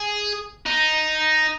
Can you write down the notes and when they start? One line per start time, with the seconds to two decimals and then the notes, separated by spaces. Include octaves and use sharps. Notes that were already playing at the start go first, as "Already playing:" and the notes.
Already playing: G#4
0.66 D#4